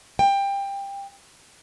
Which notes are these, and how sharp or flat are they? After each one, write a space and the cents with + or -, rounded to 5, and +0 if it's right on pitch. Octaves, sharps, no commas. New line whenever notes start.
G5 +20